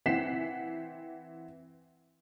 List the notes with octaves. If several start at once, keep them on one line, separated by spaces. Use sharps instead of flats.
E3 C4 F#5 B6 C7 E7